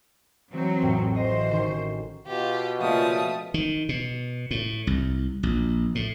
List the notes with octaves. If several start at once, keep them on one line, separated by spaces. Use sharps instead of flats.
E3 F#3 C4 G6
A1 F2 A2
E3 F#4 C5 D#5
D#3 C#4 C6
B2 F4 G4
A#2 C#3 F3 A3 D#6
D#3
B2
A2
C2
A#1
A2